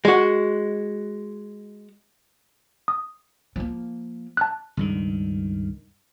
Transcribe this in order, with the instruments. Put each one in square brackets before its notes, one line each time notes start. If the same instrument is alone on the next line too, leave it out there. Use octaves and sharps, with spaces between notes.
[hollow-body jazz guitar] G#3 F#4
[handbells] D#6
[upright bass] F3 A#3
[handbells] A5 F#6
[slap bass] C#2 G2 D#3